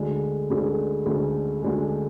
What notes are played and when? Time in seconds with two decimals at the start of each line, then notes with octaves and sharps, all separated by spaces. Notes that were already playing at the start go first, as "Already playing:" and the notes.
Already playing: D2 D3 G#3
0.50 D2 D3 G#3
1.06 D2 D3 G#3
1.62 D2 D3 G#3